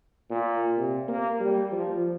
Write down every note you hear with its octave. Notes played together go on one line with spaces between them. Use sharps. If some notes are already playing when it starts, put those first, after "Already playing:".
A#2
C3
A#3
G3
F3